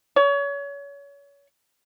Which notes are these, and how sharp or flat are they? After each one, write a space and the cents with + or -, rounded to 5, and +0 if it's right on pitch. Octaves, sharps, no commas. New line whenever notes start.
C#5 +30